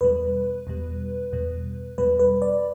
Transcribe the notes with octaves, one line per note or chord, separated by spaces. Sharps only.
E2 B2 G3 B4
E2 B2 G3
E2 B2 G3
E2 B2 G3 B4
B4
D5